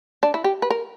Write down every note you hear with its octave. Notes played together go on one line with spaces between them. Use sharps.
D4
E4
G4
B4
A#4